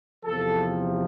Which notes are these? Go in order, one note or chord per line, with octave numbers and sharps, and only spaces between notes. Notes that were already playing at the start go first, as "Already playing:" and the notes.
E2 C3 F3 A4